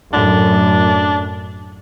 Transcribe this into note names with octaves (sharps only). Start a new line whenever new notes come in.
F#2 A2 D4